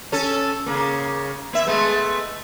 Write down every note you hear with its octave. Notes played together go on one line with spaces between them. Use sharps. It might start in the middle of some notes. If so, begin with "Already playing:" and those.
C#4 A4
C#3 A#3
A#3 E5
G#3 A3 B3